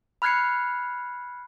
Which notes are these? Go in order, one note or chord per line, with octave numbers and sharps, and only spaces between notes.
B5 F6 F#6 G#6 C7 C#7